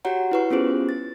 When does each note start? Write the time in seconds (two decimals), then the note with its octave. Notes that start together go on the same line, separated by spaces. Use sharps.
0.05 F#4 G4 C#5 F#5 A#5
0.31 E4 B4 C#6
0.50 B3 C#4 F4 G4 G#4 C5
0.89 A6